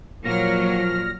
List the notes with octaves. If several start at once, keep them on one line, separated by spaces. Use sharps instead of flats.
A#2 F3 F#3 A#3 F6 A#6